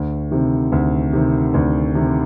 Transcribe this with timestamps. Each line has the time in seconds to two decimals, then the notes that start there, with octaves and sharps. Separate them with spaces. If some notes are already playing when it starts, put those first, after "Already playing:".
Already playing: D2
0.31 C3 D#3
0.72 D2
1.13 C3 D#3
1.54 D2
1.95 C3 D#3